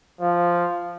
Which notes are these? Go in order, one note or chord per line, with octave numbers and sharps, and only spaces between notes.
F3